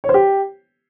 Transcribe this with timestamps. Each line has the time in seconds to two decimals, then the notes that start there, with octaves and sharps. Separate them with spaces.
0.04 C#5
0.09 C5
0.14 G4